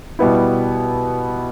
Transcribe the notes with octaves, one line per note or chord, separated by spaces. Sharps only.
B2 G3 B3 E4